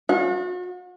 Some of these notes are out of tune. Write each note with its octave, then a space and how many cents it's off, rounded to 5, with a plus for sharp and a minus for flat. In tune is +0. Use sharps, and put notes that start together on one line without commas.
F#4 -40